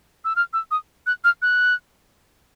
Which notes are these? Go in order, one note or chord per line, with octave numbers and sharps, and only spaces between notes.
E6
F6
E6
D#6
F#6
F6
F#6